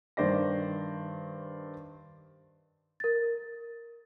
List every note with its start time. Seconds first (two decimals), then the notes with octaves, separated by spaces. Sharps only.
0.17 G2 D#3 C5 D5 A#6
3.00 A#4 A6